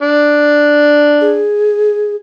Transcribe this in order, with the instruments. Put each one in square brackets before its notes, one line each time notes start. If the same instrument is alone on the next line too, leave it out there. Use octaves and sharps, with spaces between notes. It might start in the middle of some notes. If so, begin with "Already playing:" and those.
[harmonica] D4
[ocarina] G#4